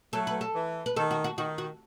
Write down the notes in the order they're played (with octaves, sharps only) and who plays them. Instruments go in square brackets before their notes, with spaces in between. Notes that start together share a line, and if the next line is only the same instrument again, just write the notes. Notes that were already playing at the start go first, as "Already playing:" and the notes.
[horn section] F#3 A3 [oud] A4
[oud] B4
A4
[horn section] E3
[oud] B4
[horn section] D#3 [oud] A4
[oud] F#4
F#4
[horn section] D#3 [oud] F#4
[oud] F#4